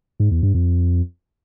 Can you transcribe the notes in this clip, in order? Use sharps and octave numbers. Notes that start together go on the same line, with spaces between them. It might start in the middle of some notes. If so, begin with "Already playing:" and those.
G#2
E2
G2
F2